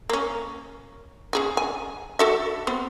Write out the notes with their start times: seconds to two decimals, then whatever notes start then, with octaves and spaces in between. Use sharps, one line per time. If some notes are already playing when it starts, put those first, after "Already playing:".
0.09 A#3 C#4
1.33 C#3 G#4 G#5
1.57 G#5
2.19 F#4 A4 E5
2.67 B3 C4